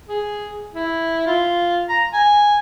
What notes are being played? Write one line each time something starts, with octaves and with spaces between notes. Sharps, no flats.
G#4
E4
F4
A#5
G#5